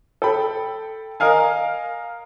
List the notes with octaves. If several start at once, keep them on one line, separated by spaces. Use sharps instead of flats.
A4 G5 B5
A#4 D#5 F5 G#5